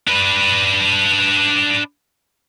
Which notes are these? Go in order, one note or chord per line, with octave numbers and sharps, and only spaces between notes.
D4 B4